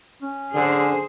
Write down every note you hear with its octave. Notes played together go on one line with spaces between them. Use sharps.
C#4
D3 G#4 C5